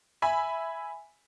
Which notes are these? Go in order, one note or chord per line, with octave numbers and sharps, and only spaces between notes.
E5 G#5 B5